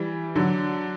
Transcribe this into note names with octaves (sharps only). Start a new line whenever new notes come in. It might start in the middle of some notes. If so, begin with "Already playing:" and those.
Already playing: E3 G3
D3 F#3